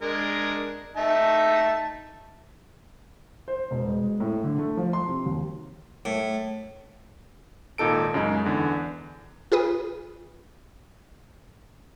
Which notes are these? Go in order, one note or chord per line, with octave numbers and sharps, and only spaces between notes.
G#3 D4 A#4
D#4 E5 A5
C5
E1
G#3
G#3
A2
D3
A3
F3
C6
C3
D#2
A2
G#1 A#2 D#4 A4 D7
F#2 C#3 G#3 D#4
E2 D3
F4 G#4 B4 D#6